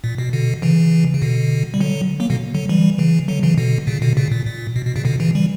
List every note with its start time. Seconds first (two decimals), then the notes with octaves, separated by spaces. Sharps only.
0.04 A#2
0.18 B2
0.33 B2 D3
0.62 C#3 E3
1.14 C#3
1.22 B2 D3
1.74 G3
1.80 D3 F#3
2.20 F#3 A#3
2.30 B2 D3
2.54 D3 F#3
2.69 E3 G3
2.98 C#3 E3
3.28 D3 F#3
3.43 C#3 E3
3.58 B2 D3
3.87 A#2 C#3
4.02 B2 D3
4.17 A#2 C#3
4.32 A#2
4.46 A#2
4.76 B2
4.86 B2
4.96 A#2 C#3
5.05 B2 D3
5.20 C#3 E3
5.35 E3 G3